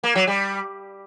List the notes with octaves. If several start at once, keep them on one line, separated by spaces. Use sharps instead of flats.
A#3
F#3
G3